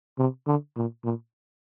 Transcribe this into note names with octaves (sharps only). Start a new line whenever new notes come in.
C3
D3
A#2
A#2